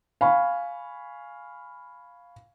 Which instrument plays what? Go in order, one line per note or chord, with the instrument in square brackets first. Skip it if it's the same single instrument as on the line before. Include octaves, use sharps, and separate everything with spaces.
[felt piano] F5 G#5 B5 C#6